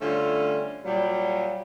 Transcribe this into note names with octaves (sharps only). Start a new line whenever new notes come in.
D3 G3 A3 C#4 F4
A#2 F#3 G3